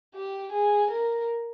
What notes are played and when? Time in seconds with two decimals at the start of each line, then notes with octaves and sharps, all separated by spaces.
0.15 G4
0.52 G#4
0.90 A#4